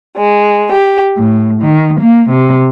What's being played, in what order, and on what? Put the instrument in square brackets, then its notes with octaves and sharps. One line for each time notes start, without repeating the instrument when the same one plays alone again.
[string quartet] G#3
G4
A2
D#3
A#3
C3